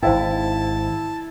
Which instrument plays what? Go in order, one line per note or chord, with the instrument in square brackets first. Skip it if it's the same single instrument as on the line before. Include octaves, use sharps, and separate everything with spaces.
[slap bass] G#1 G#2 [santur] E4 [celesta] C5 F5 G5 [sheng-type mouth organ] A5